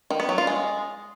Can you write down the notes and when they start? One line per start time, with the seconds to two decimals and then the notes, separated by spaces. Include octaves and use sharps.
0.10 D#3
0.20 B3
0.29 F#3
0.38 F4
0.47 G#3